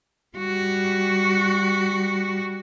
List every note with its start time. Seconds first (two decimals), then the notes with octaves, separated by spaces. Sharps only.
0.37 G3 F#4